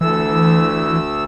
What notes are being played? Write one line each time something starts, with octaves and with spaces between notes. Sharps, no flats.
D2 E3 A3 E6